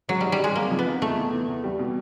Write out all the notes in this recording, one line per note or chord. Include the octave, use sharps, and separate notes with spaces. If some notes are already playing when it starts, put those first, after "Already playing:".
F#3 G#3
G3 D#4
G3
G#3 D#4
A#3 C4
F3
B3
D#4
E2 A3
E2
E2
E2
G3
B2